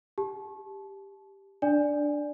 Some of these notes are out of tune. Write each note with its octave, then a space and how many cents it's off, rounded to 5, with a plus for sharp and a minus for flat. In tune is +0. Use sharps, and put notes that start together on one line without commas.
G4 +5 A5 -30
D4 +0 D5 +0 G#5 +0